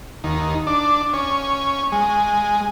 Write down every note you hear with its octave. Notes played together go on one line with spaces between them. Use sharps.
D#2
D4
C#4
G#3